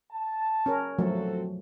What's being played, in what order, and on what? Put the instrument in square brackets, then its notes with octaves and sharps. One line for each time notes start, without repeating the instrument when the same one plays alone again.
[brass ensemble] A5
[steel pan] C#4 A#4
[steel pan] F3 F#3 A3 [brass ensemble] C4 F#4 A4